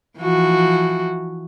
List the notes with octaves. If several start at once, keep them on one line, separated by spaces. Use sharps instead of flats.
E3 F3 F#4